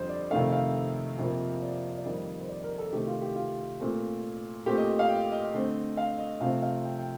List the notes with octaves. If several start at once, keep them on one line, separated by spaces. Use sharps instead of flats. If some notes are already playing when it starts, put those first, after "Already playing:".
Already playing: F2 D3 G3 C5
D5
F2 C3 D#3 A3 F5
F5
F2 C3 F3 A#3
D5
D5
F2 D#3 G3 A#3 D#5
C5
D5
A#4
A4
C3 D#3 A3 C4 G4
F4
G4
F4
A#2 A3 C4
A#2 A3 C4 G4
D#5
F5
G5
D#5
D3 A3 C4
F5
D#5
C3 F3 A3 C4 F5
F5
G5
G5